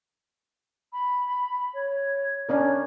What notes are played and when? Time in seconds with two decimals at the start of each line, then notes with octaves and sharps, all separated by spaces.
0.93 B5
1.74 C#5
2.49 C#4 D4 A#4 C#5